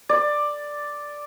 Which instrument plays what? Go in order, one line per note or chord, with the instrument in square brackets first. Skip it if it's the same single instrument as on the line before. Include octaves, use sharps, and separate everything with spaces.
[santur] D5